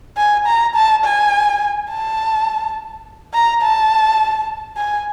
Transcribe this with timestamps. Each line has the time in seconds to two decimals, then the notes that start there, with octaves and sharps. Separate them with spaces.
0.17 G#5
0.46 A#5
0.75 A5
1.04 G#5
1.90 A5
3.34 A#5
3.62 A5
4.77 G#5